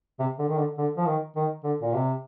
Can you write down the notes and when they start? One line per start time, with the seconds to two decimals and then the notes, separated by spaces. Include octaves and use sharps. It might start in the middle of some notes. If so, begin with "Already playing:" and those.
0.19 C3
0.39 D3
0.49 D#3
0.58 D3
0.78 D3
0.97 F3
1.06 D#3
1.36 D#3
1.64 D3
1.81 A#2
1.94 C3